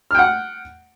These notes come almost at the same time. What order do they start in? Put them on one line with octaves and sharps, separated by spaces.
F6 G5 F#5